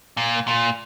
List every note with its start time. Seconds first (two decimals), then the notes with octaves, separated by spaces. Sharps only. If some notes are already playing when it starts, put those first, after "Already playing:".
0.17 A#2
0.48 A#2